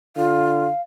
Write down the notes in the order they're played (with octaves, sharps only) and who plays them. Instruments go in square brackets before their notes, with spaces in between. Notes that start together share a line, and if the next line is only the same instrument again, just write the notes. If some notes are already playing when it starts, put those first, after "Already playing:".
[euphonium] D3 [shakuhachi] F4 [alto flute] F5